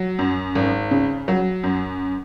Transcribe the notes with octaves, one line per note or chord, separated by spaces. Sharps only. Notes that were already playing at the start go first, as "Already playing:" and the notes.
Already playing: F#3
F#2
G#1
C#3
F#3
F#2